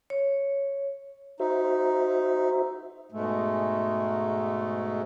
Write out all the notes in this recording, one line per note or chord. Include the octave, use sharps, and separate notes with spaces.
C#5
D#4 F#4 C5 E5
G#2 B2 G#3 A3